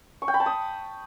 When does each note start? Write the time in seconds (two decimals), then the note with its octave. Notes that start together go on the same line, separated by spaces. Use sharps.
0.22 C#6
0.28 G5
0.34 B5
0.40 A5
0.46 D#6